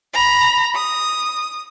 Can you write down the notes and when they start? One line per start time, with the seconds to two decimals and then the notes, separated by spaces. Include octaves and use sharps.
0.14 A#5 B5
0.74 D#6